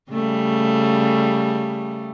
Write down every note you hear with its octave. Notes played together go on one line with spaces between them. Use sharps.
C#3 G3 A3